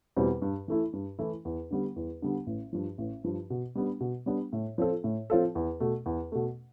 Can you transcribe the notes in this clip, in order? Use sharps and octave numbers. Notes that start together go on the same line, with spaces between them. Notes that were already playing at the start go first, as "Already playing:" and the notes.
E2 B2 G3 C4
G2
E3 A3 E4
G2
E3 A3 E4
E2
D3 G3 B3
E2
D3 G3 B3
A1
G2 F3
A1
G2 F3
B2
G3 B3 D4
B2
G3 B3 D4
A2
F3 C4 F4 A4
A2
F3 C4 F4 A4
E2
B2 A3
E2
B2 A3